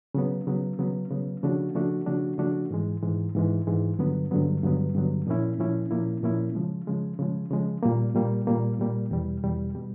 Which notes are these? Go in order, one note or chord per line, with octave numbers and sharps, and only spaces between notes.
C#3 F#3 B3
C#3 F#3 B3
C#3 F#3 B3
C#3 F#3 B3
C#3 F3 A3 D4 F#4
C#3 F3 A3 D4 F#4
C#3 F3 A3 D4 F#4
C#3 F3 A3 D4 F#4
G#2 E3 G#3
G#2 E3 G#3
G#2 E3 G#3
G#2 E3 G#3
G2 D3 F#3 B3
G2 D3 F#3 B3
G2 D3 F#3 B3
G2 D3 F#3 B3
A#2 F3 A#3 C#4 E4
A#2 F3 A#3 C#4 E4
A#2 F3 A#3 C#4 E4
A#2 F3 A#3 C#4 E4
C#3 F3 G#3
C#3 F3 G#3
C#3 F3 G#3
C#3 F3 G#3
A#2 G3 A#3
A#2 G3 A#3
A#2 G3 A#3
A#2 G3 A#3
E2 B2 G3
E2 B2 G3
B2 G3